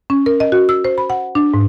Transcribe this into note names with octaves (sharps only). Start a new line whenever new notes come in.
C#4
A#4
D#5
F#4
E6
C5
B5
F#5
D4
G#2